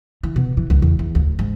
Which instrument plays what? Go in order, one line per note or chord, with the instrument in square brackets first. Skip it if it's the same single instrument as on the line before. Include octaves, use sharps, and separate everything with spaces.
[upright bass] E3
B2
E3
C#2
E2
E2
D2
G#2